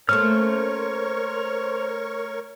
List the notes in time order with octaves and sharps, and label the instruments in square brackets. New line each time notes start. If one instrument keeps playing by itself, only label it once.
[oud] A3 A#3 C#4 [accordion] A#4 C#5 C#6 [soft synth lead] C5 [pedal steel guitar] F6